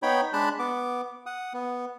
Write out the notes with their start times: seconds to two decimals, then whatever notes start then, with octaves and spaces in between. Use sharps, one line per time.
0.03 B3 D#4 C#5 G5 B5
0.33 G#3 D4 A5 B5 F#6
0.59 B3 D6
1.26 F#5 D#6
1.53 B3